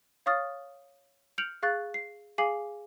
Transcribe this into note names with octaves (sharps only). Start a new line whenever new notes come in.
C#5 F5 C#6 D#6 F6 A6
F6 G6 C#7 D7 F7 F#7
G#4 F5 C#6 F#6 A6
C7
G#4 F5 G#5 D6 C7 F#7